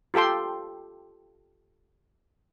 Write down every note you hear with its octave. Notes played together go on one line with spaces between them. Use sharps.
F4 G4 A4 G5 C6